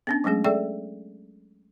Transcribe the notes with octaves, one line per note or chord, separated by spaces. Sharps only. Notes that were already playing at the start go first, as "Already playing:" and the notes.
B3 C#4 D4
F#3 G#3 A3 C#4 G#4
G#4 A4 D5 E5 G5